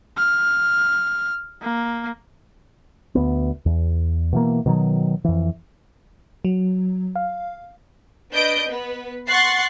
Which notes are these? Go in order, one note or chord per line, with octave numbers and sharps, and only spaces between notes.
F6
A#3
D2 B3
E2
B2 E3 A#3
B2 D#3 F#3
F2 E3
F#3
F5
D4 B4 D#5 G6 D7
B3 B4
F#5 C6 C#6 F#6 A6 C7